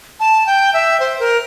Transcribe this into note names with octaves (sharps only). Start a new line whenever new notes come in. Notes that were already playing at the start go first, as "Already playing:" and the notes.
A5
G5
E5
C5
A#4